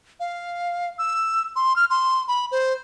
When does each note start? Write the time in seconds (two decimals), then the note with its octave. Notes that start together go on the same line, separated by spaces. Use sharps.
0.20 F5
0.98 E6
1.56 C6
1.76 F6
1.90 C6
2.28 B5
2.51 C5